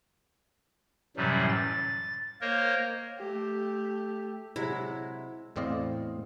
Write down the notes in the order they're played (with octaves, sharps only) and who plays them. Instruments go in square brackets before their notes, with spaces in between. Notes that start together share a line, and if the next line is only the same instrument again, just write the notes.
[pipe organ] F#2 A2 C3 E3 F#3 G3
A6
A#3 A#4 C5 C#5 D#5
[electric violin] A3 G4
[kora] C3 F#3 G#3 [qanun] E4
[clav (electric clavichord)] E2 A2 C4 D5 D#5 F5